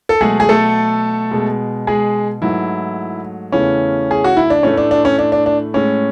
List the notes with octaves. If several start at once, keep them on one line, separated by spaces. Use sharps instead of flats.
A4
B2 F#3 G#3 A3 G#4
G#4
A3 A4
B2 G#3
G#3 G#4
G#2 E3 F#3 A3 E4
E2 C#3 E3 A3 C#4
G#4
F#4
E4
D4
A2 E3 A3 C#4
D4
D4
C#4
D4
D4
D4
A2 G#3 C#4